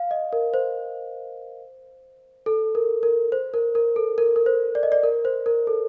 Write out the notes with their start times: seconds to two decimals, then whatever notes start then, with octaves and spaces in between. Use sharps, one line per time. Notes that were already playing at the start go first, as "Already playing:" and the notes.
Already playing: F5
0.11 D#5
0.33 A#4
0.54 C5
2.46 A4
2.75 A#4
3.03 A#4
3.32 C5
3.54 A#4
3.75 A#4
3.96 A4
4.18 A#4
4.36 A#4
4.46 C5
4.75 D5
4.83 D#5
4.92 D5
5.03 A#4
5.25 C5
5.46 A#4
5.67 A4